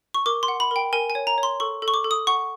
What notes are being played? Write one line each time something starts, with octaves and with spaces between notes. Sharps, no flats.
C#6
A#4 D6
C6
F#5
B5
A#4 G5
A#4 G#5
G#5
C#5
A#5
C#5
C6
A4 C#6
A4
C#6
D6
A4
D#6
F#5 C#6